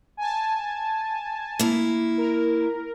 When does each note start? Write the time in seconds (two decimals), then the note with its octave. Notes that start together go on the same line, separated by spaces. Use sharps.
0.17 G#5 A5
1.59 A#3 E4
2.18 A#4